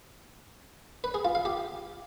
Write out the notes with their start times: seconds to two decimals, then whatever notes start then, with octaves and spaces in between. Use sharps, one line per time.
1.04 B4
1.14 G#4
1.25 F4
1.35 F5
1.45 G4